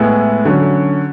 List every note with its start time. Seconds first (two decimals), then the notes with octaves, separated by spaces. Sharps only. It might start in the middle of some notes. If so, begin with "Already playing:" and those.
Already playing: A2 G#3 B3 E4
0.45 D3 F#3 C#4